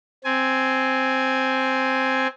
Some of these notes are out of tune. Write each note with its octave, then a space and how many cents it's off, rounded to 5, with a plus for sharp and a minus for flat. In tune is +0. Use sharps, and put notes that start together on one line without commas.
C4 +0 G#5 +10